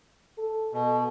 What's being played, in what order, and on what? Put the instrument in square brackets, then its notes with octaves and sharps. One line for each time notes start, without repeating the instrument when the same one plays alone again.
[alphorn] A4
[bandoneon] B2 [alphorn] A4